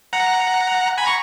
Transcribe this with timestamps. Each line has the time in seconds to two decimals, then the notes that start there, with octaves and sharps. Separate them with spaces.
0.13 F#5 A#5
0.97 G#5 B5
1.06 A#5 C#6